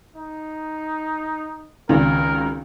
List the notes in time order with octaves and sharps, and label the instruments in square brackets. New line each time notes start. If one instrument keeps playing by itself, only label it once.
[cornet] D#4
[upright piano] G#1 C#2 [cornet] A#4